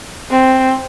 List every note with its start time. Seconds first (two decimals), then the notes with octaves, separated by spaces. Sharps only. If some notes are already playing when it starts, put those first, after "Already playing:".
0.30 C4